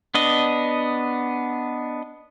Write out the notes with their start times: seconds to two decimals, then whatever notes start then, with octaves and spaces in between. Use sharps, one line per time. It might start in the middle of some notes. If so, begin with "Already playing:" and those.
0.15 B3 D4 D#5